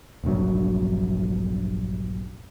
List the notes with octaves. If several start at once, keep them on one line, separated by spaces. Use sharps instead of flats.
F1 A#1 G2 F#3